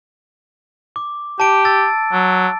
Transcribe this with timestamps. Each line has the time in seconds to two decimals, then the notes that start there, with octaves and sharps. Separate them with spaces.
0.96 D6
1.40 G4 A5 D7
1.65 E6 A6
2.13 F#3